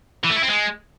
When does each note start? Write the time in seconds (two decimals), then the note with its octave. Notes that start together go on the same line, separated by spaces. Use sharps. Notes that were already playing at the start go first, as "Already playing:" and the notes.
0.24 E3
0.30 A3
0.36 E4
0.43 C4
0.49 G#3